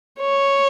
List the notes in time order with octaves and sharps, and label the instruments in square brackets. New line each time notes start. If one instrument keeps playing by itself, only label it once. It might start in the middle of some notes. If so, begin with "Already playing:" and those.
[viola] C#5